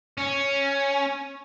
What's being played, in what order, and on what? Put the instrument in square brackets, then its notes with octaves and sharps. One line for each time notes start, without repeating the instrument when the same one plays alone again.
[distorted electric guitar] C#4